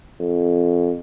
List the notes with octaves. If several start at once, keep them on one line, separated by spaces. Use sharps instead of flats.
F2